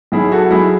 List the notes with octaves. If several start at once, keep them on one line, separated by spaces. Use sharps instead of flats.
B1 E4 G#4
F#4 A4
F#3 E4 G#4